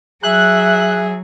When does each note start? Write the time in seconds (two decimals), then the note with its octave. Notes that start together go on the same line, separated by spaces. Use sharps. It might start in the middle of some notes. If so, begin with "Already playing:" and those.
0.23 F#3 G#4 E5 F#6